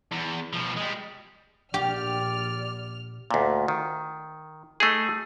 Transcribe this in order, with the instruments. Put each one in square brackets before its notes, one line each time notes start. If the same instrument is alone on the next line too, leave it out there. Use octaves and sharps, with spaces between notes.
[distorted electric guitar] E2
B2 F3
G3 G#3
[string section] A#1 F6 [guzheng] G4 [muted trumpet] D5
[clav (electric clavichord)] D2 A#2
D#3
A3 D#4 G#4